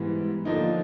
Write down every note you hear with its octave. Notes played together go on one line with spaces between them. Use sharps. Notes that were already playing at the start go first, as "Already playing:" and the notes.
Already playing: G#2 E3 G3 B3
D3 F3 A#3 D#4